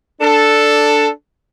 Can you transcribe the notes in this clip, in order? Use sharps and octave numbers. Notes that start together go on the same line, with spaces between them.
D4 A4